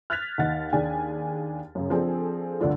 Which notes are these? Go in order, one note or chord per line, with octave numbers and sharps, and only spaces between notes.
F6 F#6 G#6 A6 B6 F7
D#2 D#4 F#5 A6
D#2 D4 G#4 G5 G#5
F#2 C#3
F3 C4 D4 G#4 A4
G1 D2 D3 D4 F4